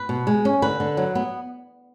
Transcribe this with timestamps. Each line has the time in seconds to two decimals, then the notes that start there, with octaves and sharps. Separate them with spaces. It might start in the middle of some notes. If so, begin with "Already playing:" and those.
Already playing: B4
0.09 B2
0.27 G#3
0.45 C#4
0.62 D3 B4
0.80 D3
0.97 F#3
1.15 B3